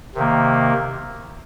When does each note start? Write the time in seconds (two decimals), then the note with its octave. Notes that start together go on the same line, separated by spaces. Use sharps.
0.15 C3 D#3 A#3